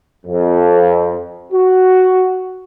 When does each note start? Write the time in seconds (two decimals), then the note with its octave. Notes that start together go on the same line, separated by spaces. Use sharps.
0.26 F2
1.53 F#4